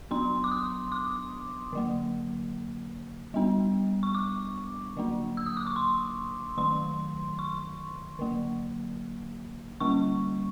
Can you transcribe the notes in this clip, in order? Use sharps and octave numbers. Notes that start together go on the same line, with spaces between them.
F#3 B3 D4 C6
D6
D#6
D6
D3 F#3 A#3
G3 B3 D4
C#6
D6
D3 F#3 A#3 D4
E6
D#6
D6
C#6
C6
D#3 F#3 A3 C6
C#6
D3 F#3 A#3
D3 G3 A#3 C#4 C#6